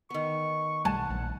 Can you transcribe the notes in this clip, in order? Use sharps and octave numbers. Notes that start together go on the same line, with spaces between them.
D#3 B3 C#6
B1 G3 A3 F#5 G#5 A5
A#1